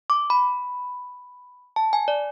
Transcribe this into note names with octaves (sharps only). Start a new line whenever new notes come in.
D6
B5
A5
G#5
D5